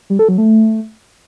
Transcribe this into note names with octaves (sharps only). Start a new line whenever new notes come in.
G3
A4
F#3
A3